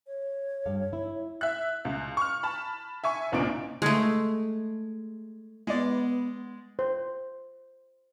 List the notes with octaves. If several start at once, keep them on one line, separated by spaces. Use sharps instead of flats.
C#5
G2 A4 F5
E4
E5 F#6
C#2
C#6 F6
A5 B5
E5 G#5 C#6
G#1 C#2 A#2 D4 D#4 D7
G#3 A3
G#3 B3 D5
C5